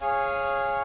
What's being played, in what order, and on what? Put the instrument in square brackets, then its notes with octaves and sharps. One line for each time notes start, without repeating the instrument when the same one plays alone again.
[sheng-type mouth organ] G#4 C#5 F5 G#5